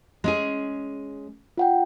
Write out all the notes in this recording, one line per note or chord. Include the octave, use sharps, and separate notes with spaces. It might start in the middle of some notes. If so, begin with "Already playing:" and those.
G#3 C#4 G#4
F4 F#5 G5